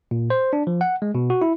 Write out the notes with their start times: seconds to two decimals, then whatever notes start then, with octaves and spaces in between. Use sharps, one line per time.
0.11 A#2
0.30 C5
0.53 D4
0.67 F3
0.81 F#5
1.02 G#3
1.15 B2
1.30 F#4
1.42 E4